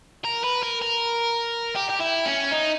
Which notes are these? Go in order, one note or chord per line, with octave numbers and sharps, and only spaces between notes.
A#4
B4
A#4
A#4
G4
G4
E4
C#4
D#4